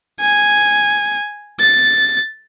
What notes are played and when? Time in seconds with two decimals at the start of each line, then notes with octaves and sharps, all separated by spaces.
0.20 G#5
1.60 A6